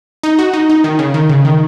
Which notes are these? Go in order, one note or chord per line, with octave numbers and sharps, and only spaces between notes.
D#4
F#4
D#4
D#4
D#3
C#3
D#3
C#3
D#3